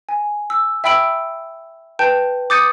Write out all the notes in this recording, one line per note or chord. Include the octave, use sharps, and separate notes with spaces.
G#5
E6
E5 G5 B5 E6 D7 F#7
B4 G5 A5 G6
D6 D#6 G6 A6 C#7 D#7